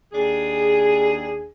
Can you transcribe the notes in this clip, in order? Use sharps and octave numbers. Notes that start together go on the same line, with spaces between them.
D#2 D4 G#4